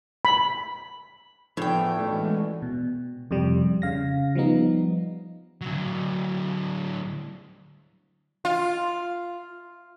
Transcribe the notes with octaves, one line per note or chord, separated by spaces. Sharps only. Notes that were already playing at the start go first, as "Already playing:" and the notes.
B5
E2 A2 F3 G5
B2 E3 G#3 A3 C#4 D4
B2
F2 C3 G3
C#3 F5 A#6
F3 G3 B3 D#4
D3 F#3
F4